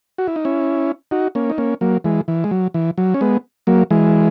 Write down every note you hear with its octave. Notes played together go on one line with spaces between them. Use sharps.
F#4
E4
D#4
C#4 E4
D#4 F#4
A#3 C#4
D#4
A#3 C#4
F#3 A#3
E3 G#3
E3
G#3
F#3
E3
F#3
C#4
G#3 B3
F#3 A#3
E3 G#3